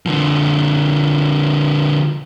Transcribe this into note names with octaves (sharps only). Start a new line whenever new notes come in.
D3 F3